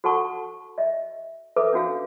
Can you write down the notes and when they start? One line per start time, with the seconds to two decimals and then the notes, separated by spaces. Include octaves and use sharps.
0.04 F#4 A4 F#5 A5 C#6
0.78 D#5 E5
1.56 A4 B4 E5 D6
1.73 C#4 D4 F#4 F5